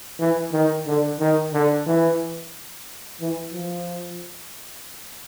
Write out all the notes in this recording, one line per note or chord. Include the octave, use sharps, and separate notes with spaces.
E3
D#3
D3
D#3
D3
E3
E3
F3